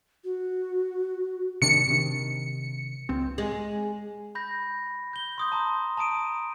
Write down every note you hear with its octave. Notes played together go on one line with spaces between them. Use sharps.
F#4
C3 D#3 D4 C#7
C3 D#3
C#2 C4
G#3
B5 G6 A#6
G6 G7
C6 D#6 G6
A5 A#5 C6
A5 A#5 D#6 D7 D#7